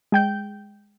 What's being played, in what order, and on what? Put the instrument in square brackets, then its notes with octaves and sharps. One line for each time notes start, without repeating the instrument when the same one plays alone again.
[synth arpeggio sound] G#3 G5 G6